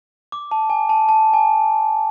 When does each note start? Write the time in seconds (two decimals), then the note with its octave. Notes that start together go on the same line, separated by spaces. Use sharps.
0.32 D6
0.51 A5
0.70 G#5
0.89 A5
1.09 A5
1.33 G#5